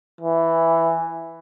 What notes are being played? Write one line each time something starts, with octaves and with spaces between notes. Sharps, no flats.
E3